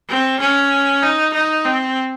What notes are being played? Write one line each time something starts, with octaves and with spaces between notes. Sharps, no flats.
C4
C#4
D#4
D#4
C4